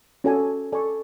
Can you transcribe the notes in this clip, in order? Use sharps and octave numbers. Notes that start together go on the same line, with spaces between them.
C#4 F#4 A4 D5 G#5
A4 D5 G#5 C#6